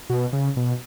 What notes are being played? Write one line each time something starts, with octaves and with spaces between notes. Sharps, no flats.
B2
C#3
B2